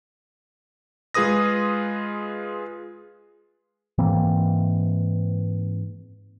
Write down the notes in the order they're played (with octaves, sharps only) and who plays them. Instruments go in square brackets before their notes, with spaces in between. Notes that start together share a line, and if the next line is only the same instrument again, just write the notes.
[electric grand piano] G#3 F4 G#4 B4 D#6 A#6
[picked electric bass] G#2 E3 A#3 C4